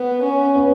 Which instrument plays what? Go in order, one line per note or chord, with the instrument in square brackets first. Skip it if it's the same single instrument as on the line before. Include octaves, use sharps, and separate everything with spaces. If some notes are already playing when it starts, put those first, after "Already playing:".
Already playing: [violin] B3
C#4
[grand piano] B3